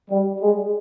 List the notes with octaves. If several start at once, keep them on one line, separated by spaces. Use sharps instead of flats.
G3
G#3